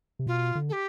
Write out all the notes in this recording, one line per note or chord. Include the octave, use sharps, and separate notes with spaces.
C3
B2 F4
D3
A4
G4